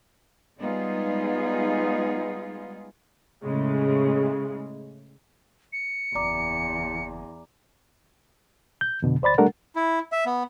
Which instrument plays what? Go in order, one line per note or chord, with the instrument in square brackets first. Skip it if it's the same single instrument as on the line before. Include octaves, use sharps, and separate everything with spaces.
[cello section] G3 G#3 B3 D#4 F4 G#4
[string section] A2 C#3 G#3
[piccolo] C#7
[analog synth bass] F#1 [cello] E2 [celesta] D5 A#5 D6
[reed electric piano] G6
F2 B2 D3
D2 C5 D5 B5 A6
G3 A3 D4 A4 A#4 F#5
[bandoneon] E4
E5
B3